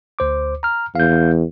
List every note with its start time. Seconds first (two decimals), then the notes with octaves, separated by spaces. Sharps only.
0.19 D2 C5 D6
0.63 A#5 F6
0.95 E2 F5 G6